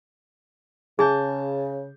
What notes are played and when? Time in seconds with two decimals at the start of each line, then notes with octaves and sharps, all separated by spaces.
0.99 C#3 G#4 G#5 A5 G6